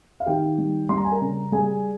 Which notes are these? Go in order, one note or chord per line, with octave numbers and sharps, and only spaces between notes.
F5
D#3 G4 G5
G3
G3 C6
A#5
G#5
A#4 A#5
C#3
G3 G#4 G#5